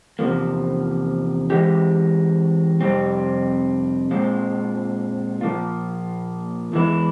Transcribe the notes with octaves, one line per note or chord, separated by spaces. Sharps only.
E2 C3 F3 A#3
E3 G#3 C4 G4
F2 C3 G3 C4
A#2 G#3 C4 F4
A#2 F3 A#3 F4
E2 E3 G#3 E4